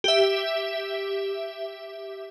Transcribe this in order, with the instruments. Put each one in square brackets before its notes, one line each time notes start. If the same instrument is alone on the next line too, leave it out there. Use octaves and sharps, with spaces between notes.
[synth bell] G4 E5